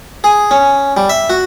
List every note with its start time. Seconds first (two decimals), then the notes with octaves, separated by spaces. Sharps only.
0.24 G#4
0.51 C#4
0.97 G3
1.10 E5
1.30 F#4